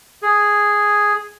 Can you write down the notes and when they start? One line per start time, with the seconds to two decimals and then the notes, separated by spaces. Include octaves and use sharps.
0.22 G#4